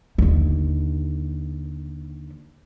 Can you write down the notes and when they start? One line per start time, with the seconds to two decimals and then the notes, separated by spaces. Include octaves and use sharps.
0.18 D#2 D3